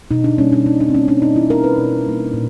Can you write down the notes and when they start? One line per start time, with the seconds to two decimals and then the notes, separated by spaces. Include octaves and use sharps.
0.11 B2 D#4
0.24 D4
0.38 G3 A#3 C#4
0.52 D4
0.66 B2 D#4
0.80 D4
0.89 C4
0.94 G3 A#3 C#4
1.08 D4
1.22 B2 D#4
1.36 E4
1.50 G3 A#4
1.54 A#3
1.64 B4
1.78 B2
2.06 G3 A#3
2.34 A#2